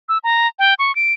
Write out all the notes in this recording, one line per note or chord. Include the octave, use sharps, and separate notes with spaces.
E6
A#5
G5
C#6
D7